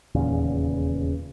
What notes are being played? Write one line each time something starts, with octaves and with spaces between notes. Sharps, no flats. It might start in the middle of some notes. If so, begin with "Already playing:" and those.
D#1 E2 A#2 C#3